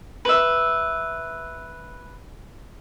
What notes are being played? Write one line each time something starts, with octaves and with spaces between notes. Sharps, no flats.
B4 E5